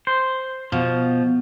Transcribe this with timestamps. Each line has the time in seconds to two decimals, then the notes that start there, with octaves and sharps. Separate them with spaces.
0.07 C5
0.72 B2 F3